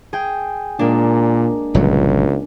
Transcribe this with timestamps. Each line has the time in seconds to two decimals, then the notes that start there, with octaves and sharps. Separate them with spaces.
0.13 G#4 G5
0.79 A#2 G#3 A#3 D4
1.75 G1 C#2 A#2 F#3